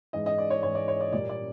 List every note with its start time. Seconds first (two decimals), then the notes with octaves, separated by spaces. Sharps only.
0.13 G#2 E3 G#3 D#5
0.26 D#5
0.38 D5
0.50 C#5
0.63 G#2 E3 G#3 C#5
0.75 D5
0.88 C#5
1.00 D5
1.13 A#2 G3 A#3 D5
1.29 D5